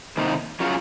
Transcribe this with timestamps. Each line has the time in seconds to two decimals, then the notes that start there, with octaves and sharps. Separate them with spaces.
0.17 C3 D#3 A#3 D#4
0.60 F#3 C#4 F4 G#4